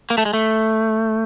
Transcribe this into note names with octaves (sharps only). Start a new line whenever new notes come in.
A#3
A3
G#3
A3